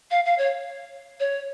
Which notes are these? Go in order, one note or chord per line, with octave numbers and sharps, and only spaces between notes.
F5
F5
C#5
C#5